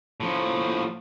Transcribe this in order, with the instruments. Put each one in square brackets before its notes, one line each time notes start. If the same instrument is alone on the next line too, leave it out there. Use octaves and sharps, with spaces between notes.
[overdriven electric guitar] A2 F3